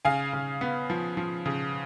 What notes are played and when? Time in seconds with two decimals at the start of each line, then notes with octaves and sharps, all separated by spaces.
0.05 C#3 F5 G#5
0.33 C#3
0.61 B3
0.90 F3
1.17 F3
1.46 C#3